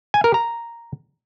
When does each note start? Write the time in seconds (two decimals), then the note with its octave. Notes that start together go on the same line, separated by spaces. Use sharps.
0.14 G#5
0.24 A#4
0.34 A#5